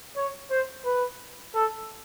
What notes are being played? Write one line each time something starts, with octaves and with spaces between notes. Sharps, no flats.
C#5
C5
B4
A4